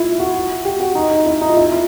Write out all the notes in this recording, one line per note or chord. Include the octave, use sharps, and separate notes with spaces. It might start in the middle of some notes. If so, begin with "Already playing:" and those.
Already playing: E4 F4
F#4
G4
F#4
D#4
D#4
E4
D#4
F4
E4
F4